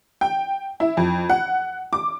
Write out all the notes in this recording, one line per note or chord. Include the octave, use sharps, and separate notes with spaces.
G5
E4
F2
F#5
D6